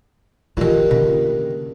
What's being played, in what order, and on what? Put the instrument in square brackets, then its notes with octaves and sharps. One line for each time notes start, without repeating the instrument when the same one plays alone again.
[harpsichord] D2 G2 D#3 [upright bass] F3 F4
[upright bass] C#3 A#3